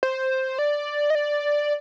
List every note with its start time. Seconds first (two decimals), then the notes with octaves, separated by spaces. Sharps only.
0.03 C5
0.59 D5
1.10 D#5
1.15 D5